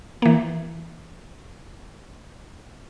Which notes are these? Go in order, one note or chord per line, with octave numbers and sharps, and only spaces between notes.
E3 A#3